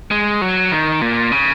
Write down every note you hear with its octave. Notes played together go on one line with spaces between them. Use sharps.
G#3
F#3
D#3
A#2
C#3